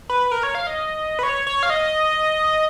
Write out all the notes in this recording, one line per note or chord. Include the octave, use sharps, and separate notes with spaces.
B4
B4
A#4
C#5
F5
D#5
B4
C#5
C#5
F5
D#5